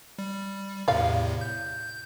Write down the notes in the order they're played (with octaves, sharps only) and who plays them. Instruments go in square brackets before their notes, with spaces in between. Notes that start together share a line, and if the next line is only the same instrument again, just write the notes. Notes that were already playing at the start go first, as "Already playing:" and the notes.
[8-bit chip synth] G3
[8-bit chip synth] E2 A2 C3 [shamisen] D5 F5
[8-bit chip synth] G6